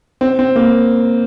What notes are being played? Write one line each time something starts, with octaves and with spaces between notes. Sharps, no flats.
C4
C4
A#3